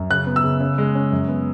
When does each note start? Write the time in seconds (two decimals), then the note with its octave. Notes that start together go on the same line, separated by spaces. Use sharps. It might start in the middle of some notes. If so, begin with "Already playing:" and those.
Already playing: F#2
0.10 C#3 F#6
0.26 B3
0.36 E6
0.44 C#3
0.60 C#3
0.78 G#3
0.95 C#4
1.12 F#2
1.28 B3